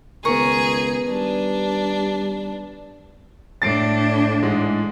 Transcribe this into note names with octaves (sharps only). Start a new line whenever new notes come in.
C#2 D#3 B3 G#4 A#4 C#6
G3 D4
A2 D4 A6 C7 D7
G#2 E3 G#3